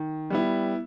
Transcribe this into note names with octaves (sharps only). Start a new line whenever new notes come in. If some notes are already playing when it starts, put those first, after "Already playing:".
Already playing: D#3
G3 B3 E4